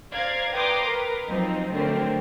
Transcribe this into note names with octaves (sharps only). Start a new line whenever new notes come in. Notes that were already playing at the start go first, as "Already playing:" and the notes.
C5 D5 F5 A#5 G#6
B4 G5 A#5 C6 D6 D#6
A#4 B4
F3 F#3 C4 D#4
D3 F#3 A3 C4 A#4